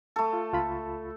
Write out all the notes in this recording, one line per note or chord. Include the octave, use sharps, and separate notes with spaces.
A3 A4
F4
C#2 F4 B5